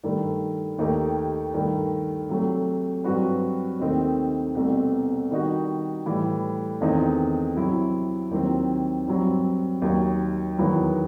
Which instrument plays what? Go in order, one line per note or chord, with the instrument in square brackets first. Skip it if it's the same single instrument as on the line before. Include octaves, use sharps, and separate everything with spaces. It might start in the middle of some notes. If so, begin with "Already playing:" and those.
[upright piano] G2 D#3 A3
D#2 D#3 A3 D#4 G4
G2 D#3 A3
C3 F#3 A3
G2 F#3 C4 F#4 B4
D#2 D#3 A3 C4 D#4
C2 B2 A3 C4
D#3 G3 D#4 F#4
A2 E3 G3
E2 D#3 A3 C4 D#4
C3 F#3 C4 E4
D#2 D#3 F#3 C4
G2 F#3 C4
D#2 D#3 F#3
E2 D#3 F#3 B3 E4